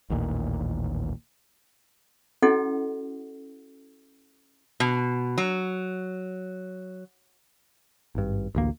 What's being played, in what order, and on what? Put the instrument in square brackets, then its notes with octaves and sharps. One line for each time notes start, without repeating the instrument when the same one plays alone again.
[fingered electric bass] A1 D#2 A#2
[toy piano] C#4 E4 F#4 A4 D#5 F#5
[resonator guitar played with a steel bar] B2
F#3
[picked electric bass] G#1 G2
A1 D2 A#3